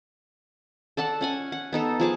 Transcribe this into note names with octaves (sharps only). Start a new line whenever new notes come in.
A4 D5 F#5 A5
C#4 F#5 G#5
F#5
B3 D#4 A4
F3 G#4 A5 D6